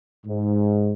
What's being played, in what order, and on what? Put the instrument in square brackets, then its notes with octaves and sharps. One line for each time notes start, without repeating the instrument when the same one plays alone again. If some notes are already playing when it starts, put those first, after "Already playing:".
[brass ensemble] G#2